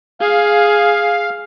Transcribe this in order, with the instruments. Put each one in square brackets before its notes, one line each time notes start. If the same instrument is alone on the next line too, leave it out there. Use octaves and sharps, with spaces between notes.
[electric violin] G#4 [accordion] F5